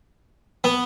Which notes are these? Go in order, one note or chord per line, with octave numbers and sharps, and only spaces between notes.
B3